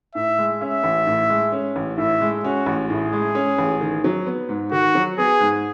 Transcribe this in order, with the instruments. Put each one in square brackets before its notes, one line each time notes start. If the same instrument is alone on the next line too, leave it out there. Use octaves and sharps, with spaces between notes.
[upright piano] A2 [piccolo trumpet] E5
[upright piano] G#3
[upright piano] C#4 [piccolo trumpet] E5
[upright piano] A1
A2
G#3
C#4
A1
[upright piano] A2 [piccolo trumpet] E5
[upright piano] G#3
[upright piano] C#4 [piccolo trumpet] F#4
[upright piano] A1
[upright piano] A2 [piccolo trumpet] G#4
[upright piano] G#3
C#4
A1
D#3
F#3
B3
G#2
[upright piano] D#3 [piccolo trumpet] F#4
[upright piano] F#3
[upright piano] B3 [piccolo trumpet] G#4
[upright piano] G#2